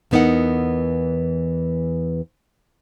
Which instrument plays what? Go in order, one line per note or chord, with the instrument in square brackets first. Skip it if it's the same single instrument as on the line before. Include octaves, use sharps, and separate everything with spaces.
[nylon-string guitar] E2 E3 B3 D#4 A#4 F#5